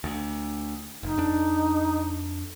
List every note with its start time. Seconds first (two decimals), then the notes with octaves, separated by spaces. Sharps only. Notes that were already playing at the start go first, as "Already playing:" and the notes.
0.04 D2
1.03 F1 D#4
1.17 F2 D4